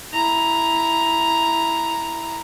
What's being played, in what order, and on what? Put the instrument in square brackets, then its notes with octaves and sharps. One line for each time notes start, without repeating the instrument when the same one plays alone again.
[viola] E4 A#5